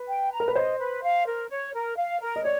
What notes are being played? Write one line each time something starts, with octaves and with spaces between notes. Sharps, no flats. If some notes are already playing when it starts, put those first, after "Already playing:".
Already playing: B4
G5
A#5
A#4
B4
C5 D#5
B4
F5
A#4
C#5
A#4
F5
A#4
D#5
C#5 D5